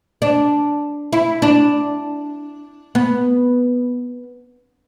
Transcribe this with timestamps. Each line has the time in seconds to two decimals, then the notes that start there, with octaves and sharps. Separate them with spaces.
0.22 D4
1.13 E4
1.42 D4
2.95 B3